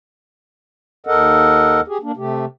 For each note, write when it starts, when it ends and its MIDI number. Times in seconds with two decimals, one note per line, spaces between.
1.07 1.81 39
1.07 1.81 69
1.07 1.81 70
1.07 1.81 75
1.07 1.81 78
1.88 1.98 67
1.88 1.98 68
2.03 2.12 58
2.03 2.12 62
2.17 2.45 48
2.17 2.45 57
2.17 2.45 67